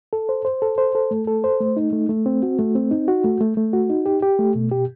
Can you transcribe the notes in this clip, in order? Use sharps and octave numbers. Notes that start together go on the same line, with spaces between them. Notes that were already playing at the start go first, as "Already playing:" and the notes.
A4
C5
C5
A4
C5
A4
A3
A4
C5
A3
D#4
A3
A3
C4
F#4
A3
C4
D#4
F#4
A3
A3
A3
F#4
D#4
G4
G4
A3
B2
G4